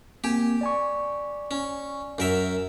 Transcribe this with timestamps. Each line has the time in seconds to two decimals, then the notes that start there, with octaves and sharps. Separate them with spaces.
0.24 A#3 C4 G4 G#5
0.61 D5 G#5 C#6
1.51 C#4
2.18 F#2 A#4 E5